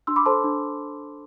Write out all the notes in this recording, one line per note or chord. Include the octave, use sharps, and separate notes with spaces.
D4 C6 E6
B5 D6
A4 C5 A5 C6
D4